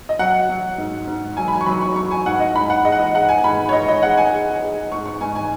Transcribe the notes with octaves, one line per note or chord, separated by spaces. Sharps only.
D#5
F#3 F#5
F#3
G#2
G#2
F#3 G#5
B5
G#5
C#6
F#3 B5
C#6
F#3 C#6
G#5
G#2 F#5
D#5
G#2 B5
F#5
G#3 D#5
F#5
D#5
G#3 F#5
G#5
G#2 B5
C#5
G#3 D#5
D#5
G#3 F#5
G#5
G#3
G#3
G#2 C#6
C#6
G#2 G#5
G#5